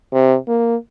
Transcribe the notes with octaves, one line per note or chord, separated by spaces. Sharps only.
C3
A#3